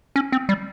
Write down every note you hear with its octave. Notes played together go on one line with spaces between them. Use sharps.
C#4
C4
G3